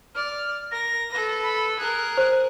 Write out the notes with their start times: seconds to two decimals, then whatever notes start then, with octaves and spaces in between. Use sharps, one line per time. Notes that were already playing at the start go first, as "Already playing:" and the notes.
0.15 D5 F6
0.71 A#4 A#6
1.10 A4 B4
1.42 B5
1.79 G#4 A#4 F#6
2.18 C5